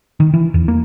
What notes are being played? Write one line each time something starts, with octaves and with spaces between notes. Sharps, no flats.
D#3
E3
E2
A#3